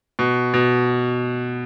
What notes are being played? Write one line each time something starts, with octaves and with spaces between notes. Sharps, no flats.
B2
B2